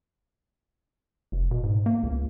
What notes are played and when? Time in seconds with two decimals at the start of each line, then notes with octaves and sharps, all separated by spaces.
1.32 F1
1.51 B2
1.63 G#2
1.86 A#3
2.03 C#2